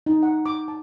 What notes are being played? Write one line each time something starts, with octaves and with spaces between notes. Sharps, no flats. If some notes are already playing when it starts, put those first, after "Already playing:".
D#4
F#5
D6
A5